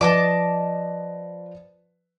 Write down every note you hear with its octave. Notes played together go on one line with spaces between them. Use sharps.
F3 B4 D5 D#5 A5 D6